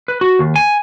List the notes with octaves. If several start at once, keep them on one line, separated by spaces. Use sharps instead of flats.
B4
F#4
D#2
G#5